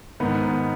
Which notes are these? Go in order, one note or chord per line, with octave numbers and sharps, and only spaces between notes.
G#2 D#3 B3